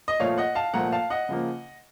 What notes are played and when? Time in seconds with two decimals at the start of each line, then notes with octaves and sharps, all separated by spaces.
0.08 D#5
0.20 A#2 F3 A3 C#5 F5
0.38 D#5 F#5
0.55 F5 A5
0.74 A#2 F3 A3 F#5 A#5
0.92 F5 A5
1.10 D#5 F#5
1.29 C#3 F3 A#3